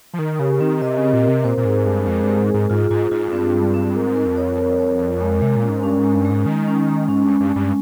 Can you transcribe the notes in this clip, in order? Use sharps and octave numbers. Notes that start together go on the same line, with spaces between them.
F3
D#3 A#4
C#3 G4
D#3 C4
C3 D#5
C#3
C4
A#2
C3 A#4
A#2 C5
A#2
G#2 G#4
G2 G#3
F2 G#3
G2 G#3
G#2
G#4
G#2
G#2 F4
G#2 F4
G#2 F4
F2
G2 C4
G3
C4
G#2 A#4
A#4
F2
C#5
A#4
C#5
A#4
G#3
C3 G#3
A#2
C#4
G#2
G2 C#4
G#2 G#3
G2
G#3
G#2
D#3 G#3
C#4
G#3
G#2 C#4
G2 G#3
G2
G#3
G2